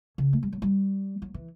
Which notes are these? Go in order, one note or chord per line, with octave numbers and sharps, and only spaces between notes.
C#3
A3
G3
F#3
G3
F#3
E3